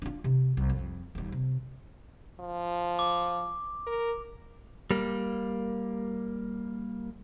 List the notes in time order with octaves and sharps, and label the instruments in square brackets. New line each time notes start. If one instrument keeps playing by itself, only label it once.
[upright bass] D4 F4
C3
C2
F2
D#1 D#2
C3
[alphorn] F3
[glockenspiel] D6
[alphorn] A#4
[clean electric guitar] G3 A#3